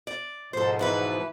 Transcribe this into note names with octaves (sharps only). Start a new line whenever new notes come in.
D5
G#2 B2 F3 A4 C5
E3 E4 B4